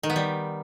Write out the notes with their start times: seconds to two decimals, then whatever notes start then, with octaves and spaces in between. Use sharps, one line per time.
0.03 D#3
0.10 B3
0.16 G3